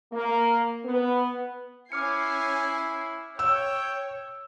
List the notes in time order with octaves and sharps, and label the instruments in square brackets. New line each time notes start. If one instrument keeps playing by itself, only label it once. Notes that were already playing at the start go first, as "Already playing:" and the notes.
[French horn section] A#3
B3
[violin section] C#4 G#5 C7 [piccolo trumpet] E4 [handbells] D6 F6 C#7
[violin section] C#5 [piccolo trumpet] G5 [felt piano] E6